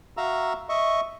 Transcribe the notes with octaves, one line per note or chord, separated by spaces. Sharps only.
F#4 E5 F5 A#5 E6
D#5 E5 C#6